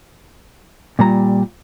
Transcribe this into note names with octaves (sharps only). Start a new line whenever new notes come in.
A#2 G3 A#5